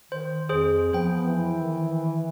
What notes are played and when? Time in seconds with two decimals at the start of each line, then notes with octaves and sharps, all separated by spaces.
0.12 D#3 C5
0.49 F2 G#4 C5
0.93 F3 B3 C5 G5
1.27 E3
1.58 D#3